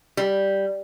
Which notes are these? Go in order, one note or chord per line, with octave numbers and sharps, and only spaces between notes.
G3